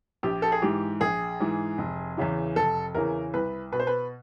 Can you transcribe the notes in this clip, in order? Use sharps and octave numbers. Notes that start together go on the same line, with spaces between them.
A#1 G4
A4
G#4
G#2 E3 G4
A#1 G#4
G#2 E3
F1
E2 C#3 E3
F1 A4
E2 C#3 E3 A#4
C2 B4
B2 B4
C5
B4